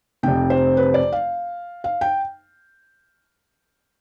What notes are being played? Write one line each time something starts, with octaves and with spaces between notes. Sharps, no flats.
F1 F2 C3 G5
C5
B4
D5
F5
F5
G5